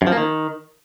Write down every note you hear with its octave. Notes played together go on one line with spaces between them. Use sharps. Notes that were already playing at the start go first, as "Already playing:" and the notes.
F#2
F3
A#3
D#3